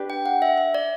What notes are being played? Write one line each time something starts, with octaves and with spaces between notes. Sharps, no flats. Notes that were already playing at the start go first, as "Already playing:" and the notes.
Already playing: D4 G4 B4
G5
F#5
E5
E5
D5